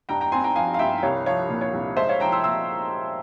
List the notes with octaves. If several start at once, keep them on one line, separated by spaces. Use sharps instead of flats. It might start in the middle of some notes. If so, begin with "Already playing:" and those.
G2 G5 A#5
G5 A#5
C4 G#5 C6
G5 A#5
F3 F5 G#5
F5
G2 E5 G5
G5
C2 C#5 F5
F3 C#5 F5
A#2
C#5
C2
G#3 C5 E5
C#5 F5
F3 G5 A#5
C6 E6
A#2 C6 E6